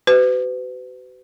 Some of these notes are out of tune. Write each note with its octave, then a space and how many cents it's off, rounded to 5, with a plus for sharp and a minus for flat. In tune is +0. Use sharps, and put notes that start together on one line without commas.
F#4 +35 B4 +40